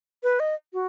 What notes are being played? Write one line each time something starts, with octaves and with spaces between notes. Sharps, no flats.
B4
D#5
F#4